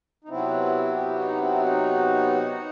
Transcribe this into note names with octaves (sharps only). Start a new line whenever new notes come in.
D#4
C3 F#3 B3 C4 E4
E4 G4
D#4 F#4
C4 E4
D#4 F#4